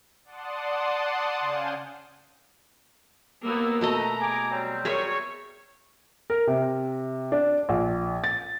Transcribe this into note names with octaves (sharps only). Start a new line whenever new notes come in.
D5 F#5 A5 C6 D#6
C#3 F5 G#5 G6
D#2 A#3 B3 E6
B2 A3 D#5 A#5
G#4 G#5 D6
F#3 G3 C4
G#4 A#4 C#5 E5
A#4
C3
D4
A#1
A6